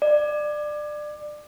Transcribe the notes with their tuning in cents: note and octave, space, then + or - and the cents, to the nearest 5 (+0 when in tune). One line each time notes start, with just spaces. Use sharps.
D5 +25